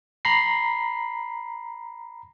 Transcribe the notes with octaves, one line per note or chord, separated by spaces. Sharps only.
A#5 B5 C7